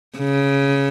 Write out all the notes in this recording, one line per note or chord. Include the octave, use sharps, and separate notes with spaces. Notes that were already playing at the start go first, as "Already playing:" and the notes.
C#3